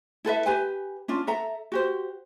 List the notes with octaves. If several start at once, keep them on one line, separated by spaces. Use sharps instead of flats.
E4 A4 B4 E5
G4 B4 G#5
C#4 D4 F4
A4 E5 A#5
F#4 G4 C5